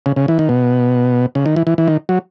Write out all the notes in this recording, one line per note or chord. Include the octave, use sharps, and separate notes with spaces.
C#3
C#3
E3
D#3
B2
C#3
D#3
E3
E3
E3
D#3
F#3